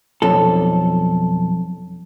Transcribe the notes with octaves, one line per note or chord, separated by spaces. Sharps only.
B1 F2 A4